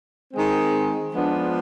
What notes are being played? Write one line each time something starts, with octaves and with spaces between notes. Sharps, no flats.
D#3 G#3 C4
F3 G#3 B3 D4